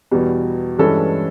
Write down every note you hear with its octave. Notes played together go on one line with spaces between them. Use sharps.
E2 B2 G3
G2 E3 G#3 C#4 A4